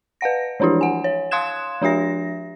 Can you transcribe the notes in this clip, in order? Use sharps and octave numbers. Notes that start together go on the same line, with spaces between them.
B4 F5 F#5 A#6
E3 F3 D4 E4 G4
F#5 G#5
C#5
F5 C6 D#6 F#6 G#6 E7
F3 D4 G4 E5 A#6